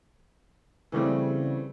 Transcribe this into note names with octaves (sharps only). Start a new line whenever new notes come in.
C#3 E3 G3 A3 C4